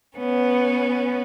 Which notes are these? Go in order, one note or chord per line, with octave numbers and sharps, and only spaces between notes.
B3 C#4